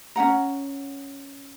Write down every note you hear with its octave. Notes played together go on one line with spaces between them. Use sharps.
C#4 D#4 F#5 A#5